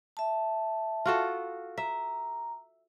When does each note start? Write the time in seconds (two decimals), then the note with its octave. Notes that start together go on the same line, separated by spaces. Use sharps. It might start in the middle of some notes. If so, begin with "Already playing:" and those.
0.17 E5 A5
1.06 F4 F#4 A4
1.78 E5 A#5